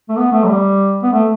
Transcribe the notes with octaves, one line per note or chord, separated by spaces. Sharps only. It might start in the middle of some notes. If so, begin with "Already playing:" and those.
A3
B3
A3
F#3
G3
B3
A3